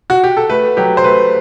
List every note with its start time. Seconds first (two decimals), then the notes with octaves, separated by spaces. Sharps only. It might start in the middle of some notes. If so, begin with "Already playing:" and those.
0.10 F#4
0.24 G4
0.37 A4
0.50 A3 B4
0.77 F#3 G4
0.97 C5
1.04 A3 B4